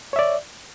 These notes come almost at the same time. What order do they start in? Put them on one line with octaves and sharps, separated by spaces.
C#5 E5 D5